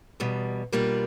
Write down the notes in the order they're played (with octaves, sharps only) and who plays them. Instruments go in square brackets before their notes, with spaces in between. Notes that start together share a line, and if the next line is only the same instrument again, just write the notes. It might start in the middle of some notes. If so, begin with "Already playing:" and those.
[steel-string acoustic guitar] E2 B2 G3
B2 G3 A#3 D4 F4